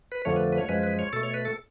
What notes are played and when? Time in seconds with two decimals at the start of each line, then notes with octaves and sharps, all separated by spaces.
0.12 B4
0.25 F2 D3 F3 A3 C#5
0.36 B4
0.52 B4
0.58 C#5
0.69 F#2 F3 G#3 B4
0.83 B4
0.99 C#5
1.13 B2 A3 A4
1.23 C#5
1.34 B4
1.45 A4